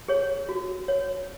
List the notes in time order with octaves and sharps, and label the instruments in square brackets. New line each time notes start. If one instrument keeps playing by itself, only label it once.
[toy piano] G#4 C#5
F#4
C#5